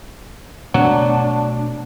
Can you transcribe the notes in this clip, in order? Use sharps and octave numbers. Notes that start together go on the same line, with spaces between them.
B2 F#3 A3 D4